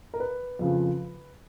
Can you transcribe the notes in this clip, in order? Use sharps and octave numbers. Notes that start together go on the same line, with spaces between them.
A#4
B4
F2 C#3 F3